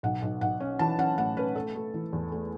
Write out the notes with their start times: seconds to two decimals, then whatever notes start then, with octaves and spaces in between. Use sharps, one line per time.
0.03 B1 F#5
0.22 B1
0.41 B1 F#5
0.60 C#4
0.79 E3 A5
0.99 C#4 F#5
1.18 A2 F#5
1.37 C#4 B4
1.55 A3 A4
1.75 A3
1.94 E3
2.13 E2
2.32 A3